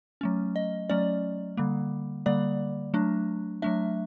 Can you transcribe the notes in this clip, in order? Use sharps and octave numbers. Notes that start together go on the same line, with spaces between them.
F#3 A3 C#4
D#5
F#3 A3 C#4 D5
D3 G3 A#3
D3 G3 A#3 D5
F#3 A3 D4
F#3 A3 D4 E5